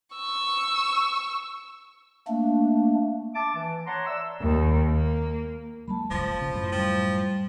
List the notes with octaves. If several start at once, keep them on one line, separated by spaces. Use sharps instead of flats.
C#6 E6
A3 A#3 D4
E5 A5 D6
E3
C#5 F#5 A5 A#5 C6
D5 E5 E6
D#2
A#3
F#3 G#3 A#3 A5 B5
D1 G1 C#2 F3
C#3
F#2 A2
F3 G3